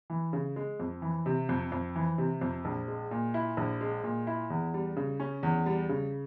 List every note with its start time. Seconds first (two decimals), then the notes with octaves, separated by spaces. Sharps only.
0.10 E3
0.33 C#3
0.56 G#3
0.80 F2
1.02 E3
1.26 C3
1.49 F2
1.72 F2
1.95 E3
2.18 C3
2.41 F2
2.65 A#1
2.88 G#3
3.11 A#2
3.34 E4
3.57 A#1
3.81 G#3
4.04 A#2
4.27 E4
4.50 E2
4.74 G3
4.97 C#3
5.20 C#4
5.43 E2
5.66 G3
5.89 C#3